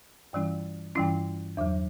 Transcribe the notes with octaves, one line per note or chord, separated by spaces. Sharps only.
G2 E3 G3 C#4 E4
G2 E3 G3 C#4 E4
E2 D3 F#3